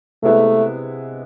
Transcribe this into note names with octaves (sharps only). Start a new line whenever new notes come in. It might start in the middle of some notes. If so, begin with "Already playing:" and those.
C3 G#3 A3 B3 E4 B4